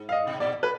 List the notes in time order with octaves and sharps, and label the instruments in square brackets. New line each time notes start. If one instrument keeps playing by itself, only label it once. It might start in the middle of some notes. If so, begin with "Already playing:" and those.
Already playing: [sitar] G#2
[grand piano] F5
D#5
[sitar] B2
[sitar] A#2 [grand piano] D5
[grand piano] B4